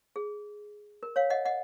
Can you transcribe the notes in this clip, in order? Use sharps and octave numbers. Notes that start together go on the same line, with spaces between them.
G#4
A#4
C#5 F5
D#5 F#5
D#5 F#5